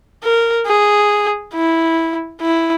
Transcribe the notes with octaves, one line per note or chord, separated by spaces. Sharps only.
A#4
G#4
E4
E4